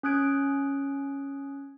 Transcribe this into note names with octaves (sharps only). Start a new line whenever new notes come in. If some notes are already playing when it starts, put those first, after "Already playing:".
C#4 D#6 F#6 G#6 D7